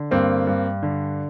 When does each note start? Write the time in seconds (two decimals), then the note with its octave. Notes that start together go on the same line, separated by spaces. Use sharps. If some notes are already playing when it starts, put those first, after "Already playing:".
Already playing: D3
0.11 G2 A#3 C4
0.47 G2
0.83 D3